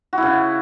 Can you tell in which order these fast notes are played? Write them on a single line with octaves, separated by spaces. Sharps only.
F#4 E4 C#3